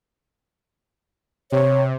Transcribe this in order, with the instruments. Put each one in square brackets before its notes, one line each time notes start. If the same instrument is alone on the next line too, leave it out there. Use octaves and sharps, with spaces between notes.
[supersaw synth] C3 [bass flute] C#5